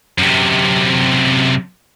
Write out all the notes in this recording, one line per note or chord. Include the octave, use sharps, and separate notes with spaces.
F#2 C3